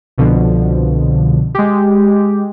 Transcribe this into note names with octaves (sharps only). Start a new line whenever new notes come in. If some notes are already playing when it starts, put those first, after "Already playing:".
C2 B2 D3 F3
G#3 G4